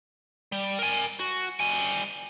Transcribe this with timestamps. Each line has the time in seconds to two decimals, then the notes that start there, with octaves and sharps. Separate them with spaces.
0.52 G3
0.79 A#4 G#5
1.20 F#4
1.60 G3 G#5